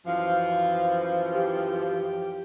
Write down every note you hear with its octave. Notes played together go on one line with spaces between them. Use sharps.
F#2 E3 F3 F5
G4